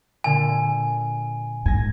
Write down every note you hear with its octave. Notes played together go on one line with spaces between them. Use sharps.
A#2 D3 G#5
G#2 G#5 A#6